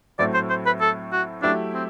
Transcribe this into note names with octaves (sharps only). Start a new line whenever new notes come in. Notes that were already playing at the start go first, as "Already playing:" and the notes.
A2 F#3 A3 C4 E4 D5
C5
C5
B4
A4
F#4
F#3 A3 D4 E4 G4
C4